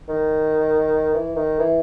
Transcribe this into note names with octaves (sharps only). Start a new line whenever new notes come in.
D#3
E3
D#3
E3